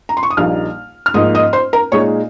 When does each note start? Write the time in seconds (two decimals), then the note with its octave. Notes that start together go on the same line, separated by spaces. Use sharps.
0.09 A#5
0.17 C6
0.23 C#6
0.30 D#6
0.37 A#1 A#2 G3 A#3 D#4 F5 F6
1.06 F6
1.14 G#2 F3 A#3 D#4 D#5 D#6
1.35 D#5 D#6
1.53 C5 C6
1.73 A#4 A#5
1.92 A#2 G#3 D#4 C#5 C#6